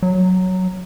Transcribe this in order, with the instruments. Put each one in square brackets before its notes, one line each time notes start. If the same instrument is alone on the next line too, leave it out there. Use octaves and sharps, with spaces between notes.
[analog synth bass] F#3